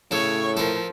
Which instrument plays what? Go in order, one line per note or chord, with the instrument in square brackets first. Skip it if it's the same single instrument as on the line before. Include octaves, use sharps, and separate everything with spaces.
[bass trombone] A2 [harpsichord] C#3 A4 [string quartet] C#5 C#6
[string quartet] F3 [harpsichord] A4 A#4